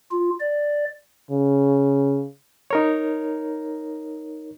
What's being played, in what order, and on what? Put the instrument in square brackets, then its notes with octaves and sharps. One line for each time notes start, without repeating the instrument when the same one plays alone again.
[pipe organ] F4
D5
[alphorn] C#3
[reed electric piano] D#4 A#4 C#5